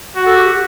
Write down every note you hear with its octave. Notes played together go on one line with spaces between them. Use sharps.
F#4
A4
G4
G4